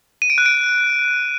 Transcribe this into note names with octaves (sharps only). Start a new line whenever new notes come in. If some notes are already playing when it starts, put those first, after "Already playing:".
D#7
D7
F#6
D7